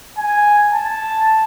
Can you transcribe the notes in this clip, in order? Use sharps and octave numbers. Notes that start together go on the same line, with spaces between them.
G#5
A5